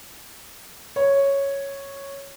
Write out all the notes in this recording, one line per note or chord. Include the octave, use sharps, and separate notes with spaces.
C#5